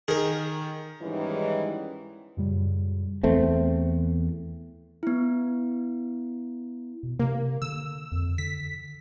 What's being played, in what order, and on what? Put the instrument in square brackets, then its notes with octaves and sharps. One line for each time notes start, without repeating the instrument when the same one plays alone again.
[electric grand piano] D#3 [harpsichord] G#4 A#4
[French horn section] G#2 D#3 E3 G3 G#3 C#4
[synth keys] F#2 A#2 C#3 G3
[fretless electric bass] E2 A3 C4
[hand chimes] B3 E4
[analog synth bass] B2
[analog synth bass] C3 [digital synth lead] A#3
[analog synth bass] D3 [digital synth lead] E6
[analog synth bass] F2
[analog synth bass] D3 [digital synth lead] B6